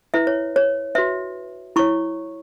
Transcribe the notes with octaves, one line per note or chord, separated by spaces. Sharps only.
E4 B4 E5
C#5
C#5
F#4 B4 E5
E4 C#5 C#6